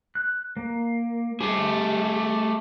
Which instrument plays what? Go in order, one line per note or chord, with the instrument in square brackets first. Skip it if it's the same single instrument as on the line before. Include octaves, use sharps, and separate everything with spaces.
[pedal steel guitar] F#6
A#3
[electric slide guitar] A3 G#4 [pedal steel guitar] G4